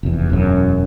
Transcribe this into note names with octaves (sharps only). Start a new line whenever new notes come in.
F1 E2
E1 F#2